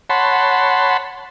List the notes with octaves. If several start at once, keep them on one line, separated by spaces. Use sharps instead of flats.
C#5 F#5 A5 B5 C6